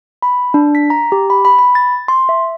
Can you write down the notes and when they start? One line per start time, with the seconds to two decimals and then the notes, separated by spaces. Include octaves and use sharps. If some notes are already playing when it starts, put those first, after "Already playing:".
0.22 B5
0.54 D4
0.75 B6
0.90 A#5
1.12 G4
1.30 B5
1.45 B5
1.59 B5
1.75 A6
2.08 C6
2.29 E5